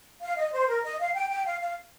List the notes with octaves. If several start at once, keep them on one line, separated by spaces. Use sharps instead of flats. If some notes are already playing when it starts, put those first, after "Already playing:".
F5
D#5
C5
A#4
D#5
F5
G5
G5
F5
F5